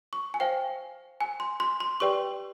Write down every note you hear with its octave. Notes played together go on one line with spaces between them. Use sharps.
C#6
G#5
C5 F5 G5
G#5
C6
C6
C6
G4 B4 D5 G5 C#6